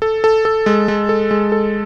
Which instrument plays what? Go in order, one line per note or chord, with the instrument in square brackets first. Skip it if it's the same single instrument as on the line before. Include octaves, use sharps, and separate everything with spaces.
[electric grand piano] A4
A4
A4
G#3
G#3
A4
G#3
A4